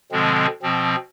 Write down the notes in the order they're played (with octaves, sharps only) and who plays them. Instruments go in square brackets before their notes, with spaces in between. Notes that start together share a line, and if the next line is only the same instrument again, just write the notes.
[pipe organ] B2 D3 F3 G#3 C4
B2 F3 C4